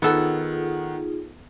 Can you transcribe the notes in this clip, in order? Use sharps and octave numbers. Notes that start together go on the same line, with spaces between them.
D#3 B3 D#4 F4 G#4 A4 F#5